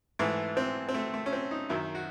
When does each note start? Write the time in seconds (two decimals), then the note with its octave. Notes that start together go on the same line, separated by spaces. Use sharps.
0.19 G#2 E3 A3
0.57 C4
0.88 C4
0.94 A3
1.14 A3
1.26 C#4
1.32 C4
1.51 D#4
1.69 F#2 D#3 E4
1.95 F#4